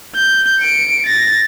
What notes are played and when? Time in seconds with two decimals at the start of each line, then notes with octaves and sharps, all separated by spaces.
0.16 G6
0.61 C#7 D7
1.06 A6 A#6